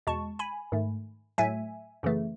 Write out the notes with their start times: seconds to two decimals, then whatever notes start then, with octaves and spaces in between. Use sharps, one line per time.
0.07 E2 B2 G#3 A5 C#6
0.39 G#5 B5
0.72 G#2 D#3 A3
1.38 A2 F#3 A3 E5 G#5
2.03 F#2 C#3 E3 A3